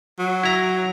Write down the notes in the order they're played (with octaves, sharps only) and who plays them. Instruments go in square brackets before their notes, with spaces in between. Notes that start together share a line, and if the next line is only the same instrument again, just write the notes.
[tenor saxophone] F#3
[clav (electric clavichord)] E4 A#5